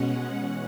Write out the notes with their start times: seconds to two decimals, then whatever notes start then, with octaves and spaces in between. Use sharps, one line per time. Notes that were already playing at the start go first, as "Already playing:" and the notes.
Already playing: B2 G#3 C#4 F#5
0.36 E3 C#4